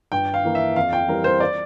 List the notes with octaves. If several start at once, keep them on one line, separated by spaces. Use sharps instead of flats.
G2 G5
F5
E3 A#3
E5
F2 F5
G5
E3 G3 C4 A#4
C5
D5